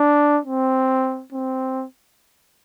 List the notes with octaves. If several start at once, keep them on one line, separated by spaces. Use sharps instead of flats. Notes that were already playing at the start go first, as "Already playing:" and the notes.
Already playing: D4
C4
C4